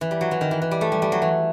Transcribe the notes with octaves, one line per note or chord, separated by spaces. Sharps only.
E3
G3
F#3
E3
D#3
E3
E3
G3
A3
G3
G3
F#3
E3